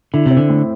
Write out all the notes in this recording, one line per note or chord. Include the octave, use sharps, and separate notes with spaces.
D3 E4
C3 C4
D3
A2